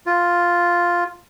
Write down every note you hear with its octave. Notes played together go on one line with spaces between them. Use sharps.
F4